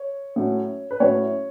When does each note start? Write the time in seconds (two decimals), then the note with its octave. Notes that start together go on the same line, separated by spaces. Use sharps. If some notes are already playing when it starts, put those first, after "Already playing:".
Already playing: C#5
0.36 A2 F#3 C#4 E4
0.91 B4
1.00 A2 F#3 C#4 E4 C#5